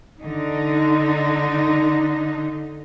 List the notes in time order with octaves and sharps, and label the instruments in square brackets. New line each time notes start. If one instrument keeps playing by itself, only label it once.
[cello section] D3 D#4